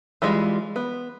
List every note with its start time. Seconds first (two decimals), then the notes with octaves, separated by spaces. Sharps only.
0.22 E3 G3 G#3 F4
0.76 B3